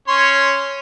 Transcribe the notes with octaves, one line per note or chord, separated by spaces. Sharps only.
C#4 C#5 C6